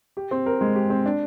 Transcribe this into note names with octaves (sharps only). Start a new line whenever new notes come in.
G4
C4
A#4
G#3
G4
C4
D4